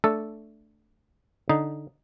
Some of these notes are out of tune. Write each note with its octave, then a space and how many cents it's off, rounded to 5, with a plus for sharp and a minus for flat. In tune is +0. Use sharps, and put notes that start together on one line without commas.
A3 +0 D4 +0 A4 +0
D3 +0 D#4 +0